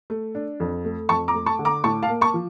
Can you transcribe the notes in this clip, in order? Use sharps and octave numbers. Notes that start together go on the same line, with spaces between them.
A3
D4
F2
A3
F2 A5 C#6
A#5 D6
A3
A5 C#6
D3
A#5 D6
A2 A5 C#6
F5 A5
A#3
A5 C#6
F3